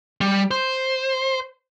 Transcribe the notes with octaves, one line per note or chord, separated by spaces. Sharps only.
G3
C5